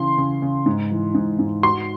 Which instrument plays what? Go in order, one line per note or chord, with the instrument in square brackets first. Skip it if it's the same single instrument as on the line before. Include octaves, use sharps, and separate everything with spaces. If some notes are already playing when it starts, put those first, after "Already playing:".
Already playing: [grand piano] C#3 E3 [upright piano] C6
[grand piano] C#3
C#3
G#2
E3
G#2
G#2
[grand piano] F#4 [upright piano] C6